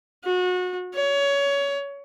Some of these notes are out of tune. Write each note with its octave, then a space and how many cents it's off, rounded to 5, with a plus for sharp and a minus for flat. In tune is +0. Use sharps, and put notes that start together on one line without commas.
F#4 -30
C#5 +20